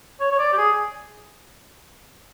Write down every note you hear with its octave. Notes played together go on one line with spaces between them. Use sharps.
C#5
C#5
D5
G4
G#4